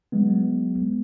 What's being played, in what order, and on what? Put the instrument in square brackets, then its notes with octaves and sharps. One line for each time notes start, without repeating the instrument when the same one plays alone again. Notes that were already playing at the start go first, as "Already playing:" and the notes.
[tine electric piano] F#3 G#3 B3